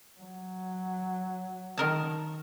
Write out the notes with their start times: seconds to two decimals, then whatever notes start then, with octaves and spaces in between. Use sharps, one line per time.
0.21 F#3
1.77 D#3 A#4 A5